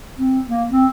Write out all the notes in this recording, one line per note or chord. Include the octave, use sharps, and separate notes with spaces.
C4
A#3
C4